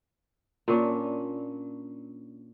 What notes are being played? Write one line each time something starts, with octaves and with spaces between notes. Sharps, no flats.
A#2 C#4 D4